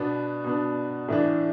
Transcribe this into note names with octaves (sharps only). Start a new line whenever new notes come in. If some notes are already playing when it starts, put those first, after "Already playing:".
Already playing: B2 B3 D4
B2 B3 D4
A2 E3 D4